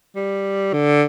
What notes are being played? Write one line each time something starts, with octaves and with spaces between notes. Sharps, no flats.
G3
D3